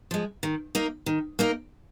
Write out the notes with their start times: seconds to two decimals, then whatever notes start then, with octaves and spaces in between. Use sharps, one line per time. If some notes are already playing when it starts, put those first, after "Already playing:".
0.11 F3 G#3
0.43 D#3
0.75 A#3 D#4 A#4
1.06 D#3
1.39 A#3 D#4 A#4